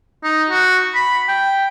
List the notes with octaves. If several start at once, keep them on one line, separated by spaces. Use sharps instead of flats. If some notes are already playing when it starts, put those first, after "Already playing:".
D#4
F#4
B5
G5